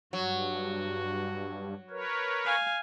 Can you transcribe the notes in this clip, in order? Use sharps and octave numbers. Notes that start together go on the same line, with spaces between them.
G2 F#3 F#4
A#4 B4 C#5
F5 G#5